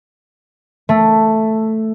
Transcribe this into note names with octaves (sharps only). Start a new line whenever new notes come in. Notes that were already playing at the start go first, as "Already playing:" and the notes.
A3